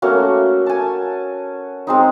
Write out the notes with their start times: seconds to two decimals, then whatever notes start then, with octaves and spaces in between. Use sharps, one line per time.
0.02 A3 A#3 C#4 F#4
0.66 G#5 A5
1.87 G#3 C4 D#4